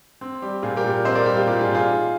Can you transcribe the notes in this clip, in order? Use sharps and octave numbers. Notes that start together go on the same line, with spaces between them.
C4
G3 G4
A#2 F4 G#4
G4 A#4
A#2
C4 C5 D#5
A#4 D5
G3 G4
F4
A#2 G4
F4 G#4
A#2
F4 G#4
D#4